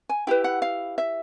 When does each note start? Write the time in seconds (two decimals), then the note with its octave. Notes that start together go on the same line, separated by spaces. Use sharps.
0.09 G#5
0.27 E4 G4 B4 G5
0.44 F#5
0.62 F5
0.98 E5